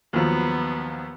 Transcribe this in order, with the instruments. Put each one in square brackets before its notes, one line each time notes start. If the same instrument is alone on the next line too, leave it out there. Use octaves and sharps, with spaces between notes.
[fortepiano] D#2 F3 F#3 [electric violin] B3